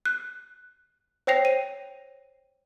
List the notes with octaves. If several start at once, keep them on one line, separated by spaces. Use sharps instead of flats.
F#6
C5 C#5 G5 A#6 C7 F7
D#7